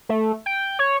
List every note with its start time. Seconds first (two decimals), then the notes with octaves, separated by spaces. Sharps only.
0.09 A3
0.46 G5
0.79 C#5